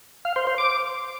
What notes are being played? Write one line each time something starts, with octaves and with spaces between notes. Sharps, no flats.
F5
C5
C5
D6